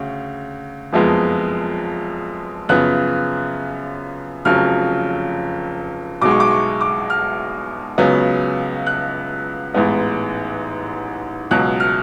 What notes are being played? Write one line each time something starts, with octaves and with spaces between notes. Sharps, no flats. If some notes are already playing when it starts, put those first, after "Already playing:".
Already playing: D2 C#3
F#1 F2 F3 G#3 B3
F#2 C#3 F3 B3 F#6
F1 F2 C#3 F#3 F6
B1 B2 G#3 D6
C#6
D6
C#6
D6
F6
C#2 C#3 F#3 B3
F#6
A1 G#2 G#3 B3
C#2 B2 F#3 F#6
F6